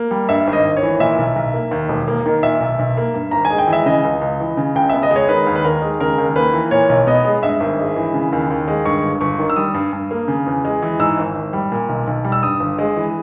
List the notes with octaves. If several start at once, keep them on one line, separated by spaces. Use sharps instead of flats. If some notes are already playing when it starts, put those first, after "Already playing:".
Already playing: A#3
G3
G2 E5
G#1
D#5
G#1
C#5
E3
A#2 E5
B1
B1
A#3
D#2
E1
A#3
D#3
A#2 E5
B1
B1
A#3
G2
G#1 A#5
G#5
G#3
G5
E3
E5
C#3 D#5
C#2
C#2
E3
C#3
C#2 G5
B3 E5
D#5
G#3 C#5
D#3 B4
D#2
B4
D#2 A#4
G#3
C#3 A#4
D#2
A#3 B4
E3
A#2 C#5
B1
B3 D#5
G#3
G2 E5
G#1
G#3
E3
C#3
D#2
D#2
G#3
G2 C#6
G1
G1 C#6
D#3
E6
G3 D#6
G2
G2
A#3
C#3
E2
G#3
E3
G#2 E6
G#1
G#1
G3
A#2
B1
B1
G3
E6
G2 D#6
G1
G#3
E3